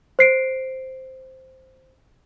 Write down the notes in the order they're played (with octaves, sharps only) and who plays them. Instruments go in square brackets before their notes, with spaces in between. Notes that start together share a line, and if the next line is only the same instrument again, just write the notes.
[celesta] C5 C7 D7